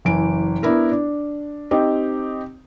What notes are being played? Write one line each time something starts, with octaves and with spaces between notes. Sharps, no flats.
F#1 E3 D7
B3 D4 E4 A#4 B4
D4
C4 D#4 G4